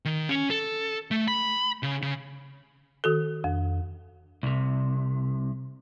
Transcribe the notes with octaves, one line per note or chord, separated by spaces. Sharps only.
D#3
C#4
A4
A3
B5
C#3
C#3
D#3 F#4 A4
F2
C2 C3